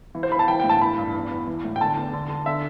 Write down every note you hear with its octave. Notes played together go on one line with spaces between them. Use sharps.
E3
C5
E3 B5
A5
E3 G5
G5
A2
A5
E3 B5
G2
E2
E2
E3
A2
G5
D3 A5
E2
D3
D3
D3 E5